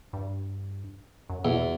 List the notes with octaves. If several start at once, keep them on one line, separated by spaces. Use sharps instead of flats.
G2
F#2
E2 B2